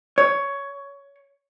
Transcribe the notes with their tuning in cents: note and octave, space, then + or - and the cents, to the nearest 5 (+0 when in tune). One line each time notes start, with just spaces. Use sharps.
C#5 +15